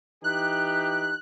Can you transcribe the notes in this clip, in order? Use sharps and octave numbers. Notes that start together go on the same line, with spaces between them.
E3 D#4 G4 F#6